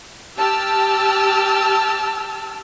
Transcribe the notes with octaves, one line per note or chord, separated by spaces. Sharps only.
G4 A5 E6 F6